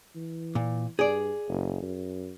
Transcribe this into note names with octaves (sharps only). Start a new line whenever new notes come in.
E3
A#2
G2 G#4 D5
F#1
F#2